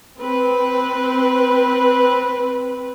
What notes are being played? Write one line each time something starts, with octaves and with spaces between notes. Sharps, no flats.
C4 B4